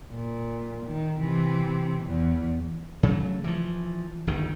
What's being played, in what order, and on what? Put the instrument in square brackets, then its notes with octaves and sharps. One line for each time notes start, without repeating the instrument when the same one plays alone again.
[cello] A#2
D#3
C3 E3
E2
[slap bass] C#3 F#3 A3
E3 F3
G1 D2 D#3